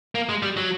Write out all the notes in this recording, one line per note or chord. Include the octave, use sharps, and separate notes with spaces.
A#3
G#3
G3
F#3